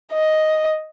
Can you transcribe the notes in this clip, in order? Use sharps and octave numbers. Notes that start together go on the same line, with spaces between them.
D#5